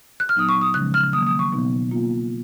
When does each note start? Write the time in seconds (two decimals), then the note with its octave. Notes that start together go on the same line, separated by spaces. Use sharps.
0.20 F#6
0.29 F6
0.36 A#2 F#3 B3 D#4 D#6
0.49 C#6
0.61 D#6
0.74 C#3 F3 G#3 C#4 F#6
0.94 F6
1.13 D#3 F#3 A#3 D#6
1.27 D#6
1.39 C#6
1.52 B2 F#3 B3 D#4
1.91 B2 A#3 F4